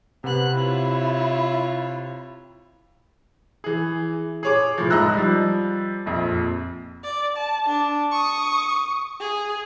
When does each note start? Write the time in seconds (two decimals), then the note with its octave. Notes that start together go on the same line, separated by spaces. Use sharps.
0.24 C3 B3 F#6
0.54 E4 F4 C#5
3.64 E3 G#4
4.43 G#4 C#5 D6
4.78 A2 F3
4.90 C#2 D#4 D#5 A#5 E6 F#6
5.14 F3 G3
6.06 A#1 F2
7.04 D5
7.36 A5
7.66 D4
8.11 C#6 D#6
9.20 G#4